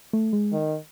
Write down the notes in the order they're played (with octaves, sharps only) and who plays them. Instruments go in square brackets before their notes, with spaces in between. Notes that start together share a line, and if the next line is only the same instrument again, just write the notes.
[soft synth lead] A3
G#3
[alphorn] D#3